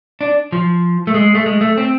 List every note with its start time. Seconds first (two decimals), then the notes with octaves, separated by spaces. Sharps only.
0.21 D4
0.52 F3
1.07 A3
1.14 G#3
1.35 A3
1.46 G#3
1.61 A3
1.77 C4